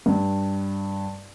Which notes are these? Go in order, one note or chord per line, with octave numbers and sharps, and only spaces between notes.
G2